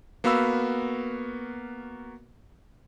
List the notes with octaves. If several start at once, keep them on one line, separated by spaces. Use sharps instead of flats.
A#3 B3 F#4 F5 B5 E6